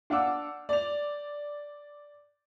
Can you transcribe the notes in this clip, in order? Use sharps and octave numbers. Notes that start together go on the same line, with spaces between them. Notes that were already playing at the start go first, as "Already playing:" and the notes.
D4 F5 F#5 D6 E6
D5 F7